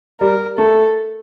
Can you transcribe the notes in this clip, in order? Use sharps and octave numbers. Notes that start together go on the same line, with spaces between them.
G3 A#4
A3 A4